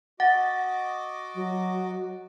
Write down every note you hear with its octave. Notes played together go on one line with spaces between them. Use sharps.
F#4 D#5 F#5 D6 A6
F#3